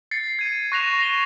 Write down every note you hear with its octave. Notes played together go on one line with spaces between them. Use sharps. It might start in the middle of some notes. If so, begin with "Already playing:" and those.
A6 C7 C#7
G#6 D#7
C#6 F#6 A#6 C7 E7 F7
A#6 C7 F7 G7